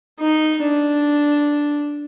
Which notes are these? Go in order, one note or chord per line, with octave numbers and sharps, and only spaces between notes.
D#4
D4